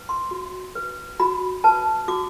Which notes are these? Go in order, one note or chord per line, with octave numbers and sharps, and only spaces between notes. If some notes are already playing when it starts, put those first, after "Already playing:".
Already playing: B4
C6
F#4
B4
F#4 B5
B4 A5
F#4 D6